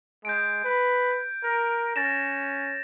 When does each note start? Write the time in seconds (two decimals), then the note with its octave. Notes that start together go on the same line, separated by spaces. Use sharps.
0.25 G#3 G6 D7
0.64 B4
1.43 A#4
1.96 C#4 A6 A#6 E7